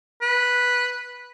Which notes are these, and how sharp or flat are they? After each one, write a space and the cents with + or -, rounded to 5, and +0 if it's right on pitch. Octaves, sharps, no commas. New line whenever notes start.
B4 -10